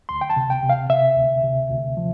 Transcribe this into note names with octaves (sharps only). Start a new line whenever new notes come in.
D2 C6
G5
A5
C3
G5
C3
F5
C3 E5
D2
C3
D2
F3